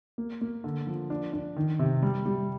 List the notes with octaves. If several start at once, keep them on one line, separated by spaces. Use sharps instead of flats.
A#3
A#3
D3
F3
D4
D4
D#3
C3
G3
G3